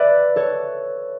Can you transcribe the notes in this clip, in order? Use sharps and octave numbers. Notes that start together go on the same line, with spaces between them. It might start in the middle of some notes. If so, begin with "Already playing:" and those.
Already playing: B4 D5 E5
A4 C#5